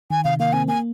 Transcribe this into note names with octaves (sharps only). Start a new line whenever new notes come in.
D#3 G#5
C3 F5
A#3 F5
C4 G#5
A#3 G#5